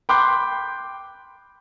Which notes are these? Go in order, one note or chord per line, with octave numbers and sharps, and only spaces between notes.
G5 B5 C6 D6 F#6 G6